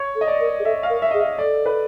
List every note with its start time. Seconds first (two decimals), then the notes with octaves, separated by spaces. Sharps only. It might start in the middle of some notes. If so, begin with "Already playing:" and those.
Already playing: C#5
0.15 A4
0.21 D#5
0.28 D5
0.40 A#4
0.59 G#4
0.65 A4 E5
0.83 F5
0.90 A#4
1.02 E5
1.11 G#4 D#5
1.20 E5
1.38 A4 D5
1.66 B4